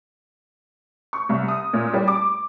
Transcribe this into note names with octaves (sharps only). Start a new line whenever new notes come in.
C#6
C2
D#6
A#2
G3
D6